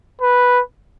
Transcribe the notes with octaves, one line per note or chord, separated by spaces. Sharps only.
B4